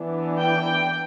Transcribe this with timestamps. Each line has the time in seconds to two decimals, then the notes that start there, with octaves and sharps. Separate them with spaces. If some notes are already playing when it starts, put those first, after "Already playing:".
Already playing: E3 B3 D4
0.41 G5